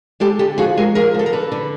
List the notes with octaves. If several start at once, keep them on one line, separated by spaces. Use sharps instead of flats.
G#3 G4 A4
D3 G4 A4
F3 F#4 G#4
G#3 G#4 A#4
F3 G#4 A#4
D3 A4
A#4
D3 A4 B4
D3